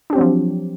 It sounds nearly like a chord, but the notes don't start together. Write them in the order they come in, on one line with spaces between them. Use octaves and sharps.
D4 G4 C4 F#3 F3